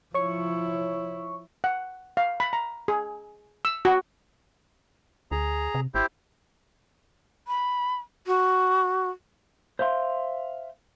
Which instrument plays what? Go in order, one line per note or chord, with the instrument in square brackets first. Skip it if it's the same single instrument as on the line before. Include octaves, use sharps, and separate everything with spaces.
[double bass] F3 E4 [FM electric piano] C#5 C#6
[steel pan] F#5
F5
B5
A#5
G#4
E6
F#4
[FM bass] D2 [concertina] G#4 A#5
[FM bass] C3
[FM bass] G#1 [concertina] E4 G4 C5
[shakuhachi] B5
F#4
[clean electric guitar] C5 E5 F5 C6